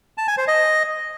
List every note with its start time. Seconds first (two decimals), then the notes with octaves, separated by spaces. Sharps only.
0.18 A5
0.28 G#5
0.38 C5
0.48 D#5